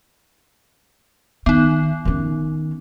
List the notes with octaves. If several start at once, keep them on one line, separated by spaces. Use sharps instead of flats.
D#3 B3 D#4
D#3 C#4